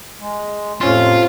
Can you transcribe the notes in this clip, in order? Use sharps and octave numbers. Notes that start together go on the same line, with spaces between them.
G#3
F2 A2 C3 F3 C#4 F4 C6